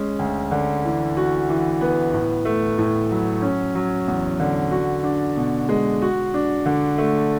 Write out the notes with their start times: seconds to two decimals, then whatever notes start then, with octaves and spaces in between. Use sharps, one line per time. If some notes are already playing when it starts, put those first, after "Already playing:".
Already playing: G#3 C#4
0.19 D2
0.51 D3
0.85 E3
1.17 F#4
1.49 E3
1.81 B3
2.13 A2
2.45 A3
2.78 A2
3.11 F#3
3.42 C#4
3.75 F#3
4.08 E2
4.40 D3
4.71 F#4
5.04 D4
5.37 B2
5.69 G#3
6.02 F#4
6.34 D4
6.66 D3
6.98 A3